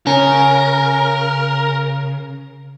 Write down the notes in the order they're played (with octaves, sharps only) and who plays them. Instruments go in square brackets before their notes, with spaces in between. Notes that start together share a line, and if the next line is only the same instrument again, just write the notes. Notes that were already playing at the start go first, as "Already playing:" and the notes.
[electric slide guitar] C#3 [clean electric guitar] C#4 [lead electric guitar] A#4